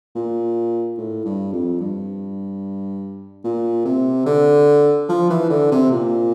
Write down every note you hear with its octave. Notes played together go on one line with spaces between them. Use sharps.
A#2
A2
G2
F2
G2
A#2
C3
D3
F3
E3
D3
C3
A#2